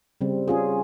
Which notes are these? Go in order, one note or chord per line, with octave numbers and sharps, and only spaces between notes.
C#3 G3 C4
C#4 F4 G#4